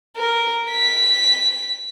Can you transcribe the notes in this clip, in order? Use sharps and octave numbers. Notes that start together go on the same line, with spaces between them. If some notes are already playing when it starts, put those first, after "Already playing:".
A#4
B6